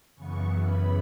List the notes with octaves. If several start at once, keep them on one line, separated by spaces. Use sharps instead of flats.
F#2 C#3 E3 B3 C#6
B5